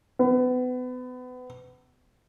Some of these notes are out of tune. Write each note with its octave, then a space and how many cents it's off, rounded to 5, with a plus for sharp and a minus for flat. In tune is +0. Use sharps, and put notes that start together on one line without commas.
B3 +30